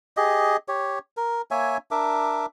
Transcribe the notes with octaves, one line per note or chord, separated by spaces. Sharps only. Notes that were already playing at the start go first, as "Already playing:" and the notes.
G4 G#4 D#5
G4 C#5
A#4
A#3 C#5 E5 G#5
D4 A#4 E5 D6